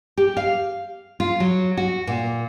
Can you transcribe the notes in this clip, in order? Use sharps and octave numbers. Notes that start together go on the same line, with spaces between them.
G4
F5
F4
F#3
F#4
A#2